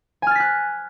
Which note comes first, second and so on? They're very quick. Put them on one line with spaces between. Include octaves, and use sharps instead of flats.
G#5 F6 A6 B6 F#6